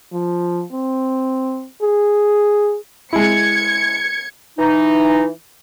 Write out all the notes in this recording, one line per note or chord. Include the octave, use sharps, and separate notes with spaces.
F3
C4
G#4
G#3 E4 G#6 C#7
E3 D#4